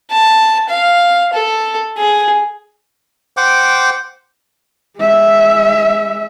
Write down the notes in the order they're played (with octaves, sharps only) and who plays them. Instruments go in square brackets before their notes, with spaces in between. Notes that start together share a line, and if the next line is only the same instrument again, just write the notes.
[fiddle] A5
F5
A4
G#4
[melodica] C5 F#5 G5 D6
[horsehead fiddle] G#3 E5